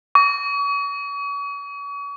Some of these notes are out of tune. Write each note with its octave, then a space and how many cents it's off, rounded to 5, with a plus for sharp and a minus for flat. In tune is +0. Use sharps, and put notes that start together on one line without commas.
C#6 +40